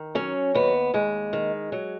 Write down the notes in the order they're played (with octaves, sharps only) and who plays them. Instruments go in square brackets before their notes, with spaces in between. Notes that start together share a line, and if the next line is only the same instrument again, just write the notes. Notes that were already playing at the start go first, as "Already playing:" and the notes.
Already playing: [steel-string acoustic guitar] D#3
F#3 C#4
D#2 B3
D#2 G#3
D#3
F#3